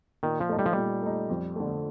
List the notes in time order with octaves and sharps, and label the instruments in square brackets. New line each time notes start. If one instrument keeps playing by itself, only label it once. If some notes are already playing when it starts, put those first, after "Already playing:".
[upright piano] A#2 [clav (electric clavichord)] D#3
[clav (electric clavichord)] F3
[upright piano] A3 D#4
[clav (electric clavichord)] G3
F3
[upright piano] A#2 [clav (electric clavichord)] G3
[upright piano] A3 D#4
F2
D3 A3